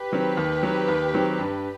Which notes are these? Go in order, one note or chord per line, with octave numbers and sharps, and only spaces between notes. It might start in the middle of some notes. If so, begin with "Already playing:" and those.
Already playing: G4 B4
D#3 F#3 C4
D#2
D#3 F#3 C4
D#2
D#3 F#3 C4
G2